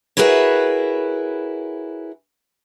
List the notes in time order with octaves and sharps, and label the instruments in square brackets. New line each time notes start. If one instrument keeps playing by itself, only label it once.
[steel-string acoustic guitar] E4 F#4 G#4 A#4 B4 C#5